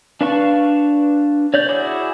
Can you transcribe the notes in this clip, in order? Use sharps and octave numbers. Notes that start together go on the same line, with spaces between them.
D4 B4 F5 A5 C#6
C#5 D5 G6
E4 F#4 G#4 D6